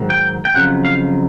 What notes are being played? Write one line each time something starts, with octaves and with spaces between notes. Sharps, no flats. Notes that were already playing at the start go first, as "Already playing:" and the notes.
Already playing: G#2 D#3 F#3
G5
G5
F2 C#3 F#3 F#5
F5